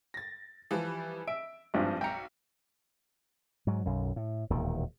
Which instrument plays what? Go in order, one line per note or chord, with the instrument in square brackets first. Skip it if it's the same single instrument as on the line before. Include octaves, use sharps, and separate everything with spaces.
[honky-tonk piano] A6 A#6
E3 F3 G3
[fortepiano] E5 [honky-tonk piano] D7
[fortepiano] G#1 G2 F3
[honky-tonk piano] B1 C#7 [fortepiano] G5 A#5
[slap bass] G#2 F#3
B1 F#2
A2
E1 D#2 A#2 D#3